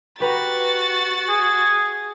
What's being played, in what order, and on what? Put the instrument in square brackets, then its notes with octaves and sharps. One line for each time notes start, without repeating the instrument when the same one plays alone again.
[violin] F#4 A6 [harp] G4 B4 A#5
[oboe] G#4